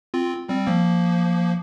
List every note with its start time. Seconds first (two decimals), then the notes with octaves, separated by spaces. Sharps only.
0.14 C4 F4
0.49 G3 C4
0.67 F3 A#3